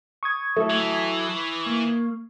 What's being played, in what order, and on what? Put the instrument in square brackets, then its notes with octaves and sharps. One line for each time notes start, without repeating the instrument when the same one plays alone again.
[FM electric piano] C#6 D#6 G#6
[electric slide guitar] F#3 E4 A4 [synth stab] A3
[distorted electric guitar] E3
[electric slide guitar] A#3